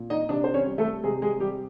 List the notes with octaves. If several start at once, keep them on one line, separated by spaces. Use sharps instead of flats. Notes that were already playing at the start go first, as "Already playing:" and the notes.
Already playing: A#2
D#4 D#5
C3 D4 D5
C5
C#4 C#5
G3
A3 A4
C3 G#3 G#4
G#3 G#4
G3 G4